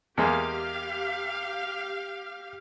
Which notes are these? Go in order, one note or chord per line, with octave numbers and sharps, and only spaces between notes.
E2 G#3 A#3 G4 F5